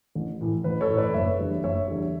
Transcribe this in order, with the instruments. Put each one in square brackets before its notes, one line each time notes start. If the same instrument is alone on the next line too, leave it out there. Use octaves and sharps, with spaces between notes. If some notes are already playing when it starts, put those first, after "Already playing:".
[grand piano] A1
A2 E3
A1 B4
A4 C#5
A2 E3
B4 D5
F#1 C#5 E5
E2 D3 G3
F#1 C#5 E5
E2 D3 G3